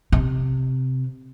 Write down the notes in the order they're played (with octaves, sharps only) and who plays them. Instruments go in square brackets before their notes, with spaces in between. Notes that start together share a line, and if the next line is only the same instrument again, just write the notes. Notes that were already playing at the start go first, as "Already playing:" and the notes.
[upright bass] C3